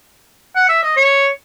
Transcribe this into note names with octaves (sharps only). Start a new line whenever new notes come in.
F#5
E5
D#5
C#5